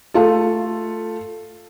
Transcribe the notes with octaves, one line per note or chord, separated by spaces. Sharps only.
A3 F4 A4